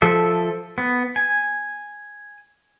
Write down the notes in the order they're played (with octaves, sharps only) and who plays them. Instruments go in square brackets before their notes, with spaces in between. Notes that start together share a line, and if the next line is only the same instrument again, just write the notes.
[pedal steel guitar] F3 A4 E5
B3
G#5